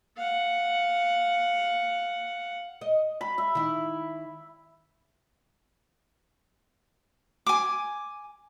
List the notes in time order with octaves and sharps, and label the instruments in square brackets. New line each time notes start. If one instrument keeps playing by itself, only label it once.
[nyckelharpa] F5 F#5
[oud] D#5
[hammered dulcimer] B5
E5
[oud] D#3 E4
[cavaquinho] G#5 D6